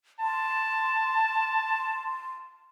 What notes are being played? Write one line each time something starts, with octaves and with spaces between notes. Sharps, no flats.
A5 C6